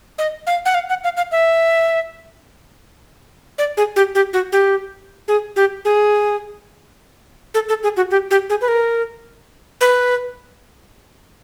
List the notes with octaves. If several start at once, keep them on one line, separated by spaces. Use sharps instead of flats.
D#5
F5
F#5
F5
F#5
F5
F5
E5
D5
G#4
G4
G4
F#4
G4
G#4
G4
G#4
A4
A4
G#4
F#4
G4
G4
G#4
B4
A#4
B4